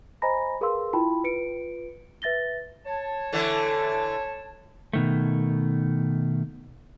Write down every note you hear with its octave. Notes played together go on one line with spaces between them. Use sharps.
C5 D#5 G#5 A#5 B5 A#6
G#4 A#4 B4 F5 C6 E6
E4 F4 G5 A5 B5
F4 B4 C#7 D7
B4 E5 A6 A#6 G7
C#5 A5
D3 E3 A3
B2 D#3 A3